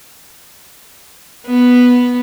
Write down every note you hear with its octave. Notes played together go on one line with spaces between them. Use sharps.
B3